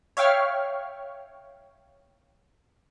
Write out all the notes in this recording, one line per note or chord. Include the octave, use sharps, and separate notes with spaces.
C#5 E5 F5 G5 C#6 F6